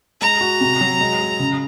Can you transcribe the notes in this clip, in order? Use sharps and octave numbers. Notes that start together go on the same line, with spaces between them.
G#3 A#5
F#4
C3
F#3
G#3
G#4
C#3